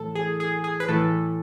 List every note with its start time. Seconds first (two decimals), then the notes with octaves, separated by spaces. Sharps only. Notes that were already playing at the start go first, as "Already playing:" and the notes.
Already playing: A2 E3 A4
0.15 G#4
0.40 G#4
0.64 G#4
0.80 B4
0.88 A2 E3 A4